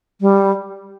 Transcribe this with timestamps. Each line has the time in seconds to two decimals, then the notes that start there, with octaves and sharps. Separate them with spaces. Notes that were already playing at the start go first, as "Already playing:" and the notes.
0.21 G3